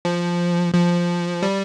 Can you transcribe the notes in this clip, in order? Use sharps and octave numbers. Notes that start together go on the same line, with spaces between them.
F3
F3
G3